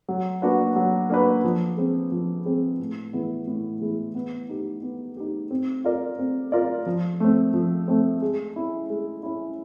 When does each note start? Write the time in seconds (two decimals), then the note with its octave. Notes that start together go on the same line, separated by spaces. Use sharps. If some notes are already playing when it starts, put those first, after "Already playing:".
0.08 F#3
0.42 A#3 D4 F#4 B4
0.76 F#3
1.10 A#3 D4 F#4 B4
1.44 F3
1.77 G#3 C4
2.12 F3
2.45 G#3 C4
2.79 A2
3.13 E3 G#3 B3 E4
3.47 A2
3.81 E3 G#3 B3 E4
4.15 B3
4.49 D#4 G4
4.83 B3
5.17 D#4 G4
5.51 C4
5.84 F4 A#4 D5
6.19 C4
6.52 F4 A#4 D5
6.86 F3
7.20 A3 C4
7.54 F3
7.88 A3 C4
8.22 G#3
8.56 C#4 E4
8.90 G#3
9.23 C#4 E4